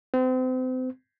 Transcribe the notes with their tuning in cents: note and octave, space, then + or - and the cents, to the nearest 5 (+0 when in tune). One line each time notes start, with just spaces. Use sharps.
C4 -35